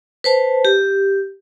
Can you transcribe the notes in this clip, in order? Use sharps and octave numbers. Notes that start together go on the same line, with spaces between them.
B4 C5 A5
G4